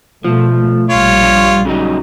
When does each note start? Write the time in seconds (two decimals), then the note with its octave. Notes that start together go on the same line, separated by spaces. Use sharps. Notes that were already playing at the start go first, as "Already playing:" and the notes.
0.24 B2 F3 A3
0.90 A#1 G3 F4 C#5
1.23 G2
1.65 C#3 F#3 D#4